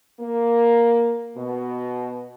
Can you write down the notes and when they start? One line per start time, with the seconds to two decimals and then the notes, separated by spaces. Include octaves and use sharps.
0.20 A#3
1.37 B2